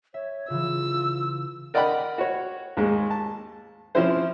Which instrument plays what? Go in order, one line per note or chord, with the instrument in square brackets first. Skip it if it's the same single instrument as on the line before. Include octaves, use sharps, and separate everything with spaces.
[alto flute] C#5 [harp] E5
[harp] C#3 E3 [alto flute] F4 [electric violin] E6
[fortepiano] A#4 D5 D#5 F#5 G5 B5
F#4 C#5
D#2 G#2 G#3
A5
F3 C4 C#4 E4 C5